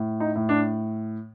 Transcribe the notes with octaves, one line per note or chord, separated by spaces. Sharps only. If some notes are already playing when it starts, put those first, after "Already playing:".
Already playing: A2
D#4
A2
D4